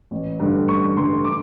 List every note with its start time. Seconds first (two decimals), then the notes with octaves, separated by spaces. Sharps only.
0.11 A1
0.40 G2 D3
0.68 A1 C#6
0.97 G2 D3 C6
1.24 D6